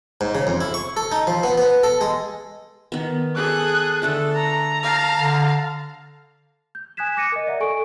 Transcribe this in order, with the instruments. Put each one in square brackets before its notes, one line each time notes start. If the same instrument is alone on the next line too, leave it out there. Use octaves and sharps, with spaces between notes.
[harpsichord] G#2
C#3
F2
E4
C#6
A4
D#4
F3
B3
B3
A4
G#3
[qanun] D#3 B3
[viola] G#4 A4 [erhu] F#6
[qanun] D3 A3 D5 [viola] A4
[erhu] A#5
[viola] F5 A5
[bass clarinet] D3
[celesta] G6
G#5 D#6 F#6 G#6 B6 E7
D6 F#6 A#6 C#7 D#7
A#4 D#5
D5 E5 F#5 A#5
A4 G#5 C#6 D7